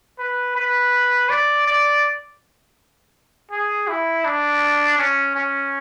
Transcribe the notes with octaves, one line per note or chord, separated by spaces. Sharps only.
B4
B4
D5
D5
G#4
E4
D4
C#4
C#4